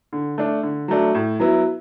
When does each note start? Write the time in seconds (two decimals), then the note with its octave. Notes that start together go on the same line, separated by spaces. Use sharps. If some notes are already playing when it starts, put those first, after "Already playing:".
0.13 D3
0.38 A3 D4
0.63 D3
0.88 F#3 A3 D4
1.14 A2
1.40 F#3 B3 E4